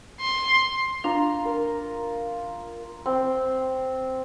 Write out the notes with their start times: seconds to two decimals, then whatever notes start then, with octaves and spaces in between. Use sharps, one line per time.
0.21 C6
1.04 D4 F4 A#5
1.45 A#4
3.06 C4